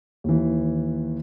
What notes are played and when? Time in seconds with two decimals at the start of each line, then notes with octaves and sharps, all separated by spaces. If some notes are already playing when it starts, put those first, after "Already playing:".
0.24 D#2 E3